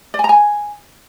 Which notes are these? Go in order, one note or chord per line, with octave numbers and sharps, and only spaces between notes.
D5
G#5
A#5
G#5